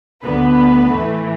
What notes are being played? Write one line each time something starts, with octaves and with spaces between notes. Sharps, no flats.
D2 D3 B3 B4
A2 E3 A3